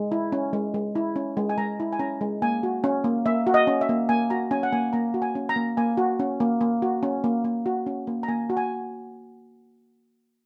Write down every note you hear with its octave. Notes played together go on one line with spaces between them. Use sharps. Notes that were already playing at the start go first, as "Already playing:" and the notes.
Already playing: G#3
E4
C#4
G#3
G#3
E4
C#4
G#3
G#5
G#3 A#5
E4
G#5
C#4 A#5
G#3
A#3 G#5
F#4
C#4
A#3
A#3 E5
F#4
D#5
C#4
E5
A#3
A#3 G#5
F#4 A#5
C#4 G#5
F#5
A#3 G#5
A#3 A#5
F#4
G#5
C#4
A#5
A#3
A#3 G#5
F#4
C#4
A#3
A#3
F#4
C#4
A#3
A#3
F#4
C#4
A#3
A#5
A#3 G#5
F#4
G#5